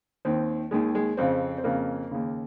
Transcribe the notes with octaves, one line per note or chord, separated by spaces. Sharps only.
D#2 D#3 C4
D#2 D#3 G#3
G#3
F2 C#3 C4
C4
F2 C#3 A#3
D#2 C#3